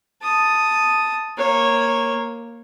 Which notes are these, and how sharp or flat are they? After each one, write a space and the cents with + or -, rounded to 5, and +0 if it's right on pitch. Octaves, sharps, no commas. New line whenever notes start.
A5 +0 D#6 +0
A#3 +0 C#5 -15